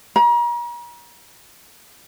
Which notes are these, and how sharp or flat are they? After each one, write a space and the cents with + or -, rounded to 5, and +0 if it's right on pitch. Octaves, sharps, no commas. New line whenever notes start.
A#5 +40